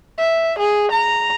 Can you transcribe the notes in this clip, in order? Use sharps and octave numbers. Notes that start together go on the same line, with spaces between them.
E5
G#4
A#5